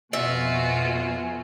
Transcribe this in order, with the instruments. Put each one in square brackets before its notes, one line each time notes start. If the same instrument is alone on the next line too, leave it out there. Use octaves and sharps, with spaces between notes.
[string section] F2 B2 [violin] F4 F#4 [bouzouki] E5 [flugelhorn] G#5